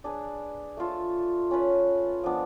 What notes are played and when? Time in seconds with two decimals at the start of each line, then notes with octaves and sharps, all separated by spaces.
0.04 D4 G#4 B4
0.77 A3 F4 A4
1.51 C#4 F4 B4 F5
2.24 F3 B3 D4